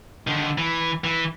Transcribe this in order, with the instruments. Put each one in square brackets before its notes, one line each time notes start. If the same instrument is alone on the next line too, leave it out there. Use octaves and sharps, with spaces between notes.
[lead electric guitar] D3 D#3
E3
E3